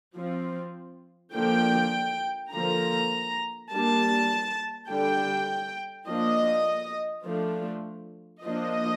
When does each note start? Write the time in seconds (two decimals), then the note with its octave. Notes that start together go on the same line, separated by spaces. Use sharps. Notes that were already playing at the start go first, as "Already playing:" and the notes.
0.16 F3 C4
1.34 D3 F3 A#3 D4 G5
2.53 D3 F3 A#3 A#5
3.71 G3 A#3 D4 A5
4.89 D3 G3 D4 G5
6.07 F3 A#3 D4 D#5
7.26 F3 A3 D4
8.44 F3 A#3 D4 D#5